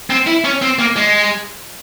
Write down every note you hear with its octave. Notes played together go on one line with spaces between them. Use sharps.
C4
E4
C#4
C4
A#3
G#3